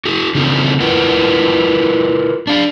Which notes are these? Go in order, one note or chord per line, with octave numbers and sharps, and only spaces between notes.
F#4 G#4
C#3 C4 C#4 D#4 F4 G#4
E4 F4 A#4 B4 F#5
D4 F5